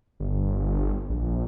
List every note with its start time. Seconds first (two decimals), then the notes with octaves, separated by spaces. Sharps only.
0.20 G1
1.09 A#1